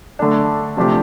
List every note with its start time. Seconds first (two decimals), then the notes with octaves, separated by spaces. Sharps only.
0.19 D3 A3 D4
0.77 C3 F3 A3 D4 G4